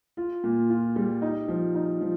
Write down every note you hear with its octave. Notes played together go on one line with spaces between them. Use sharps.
F4
A#2
F4
G3
D#4
F3
D#4
F3